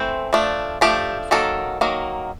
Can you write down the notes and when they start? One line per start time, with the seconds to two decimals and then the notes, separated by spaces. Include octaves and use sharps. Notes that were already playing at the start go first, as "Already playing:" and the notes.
Already playing: E3 A3 C4 C5
0.33 F3 A3 D4
0.81 F3 A3 D4 G4
1.31 D#3 F#3 A#3 A4
1.81 D#3 F#3 A#3